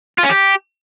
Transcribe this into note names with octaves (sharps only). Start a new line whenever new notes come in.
F4
C#4
G4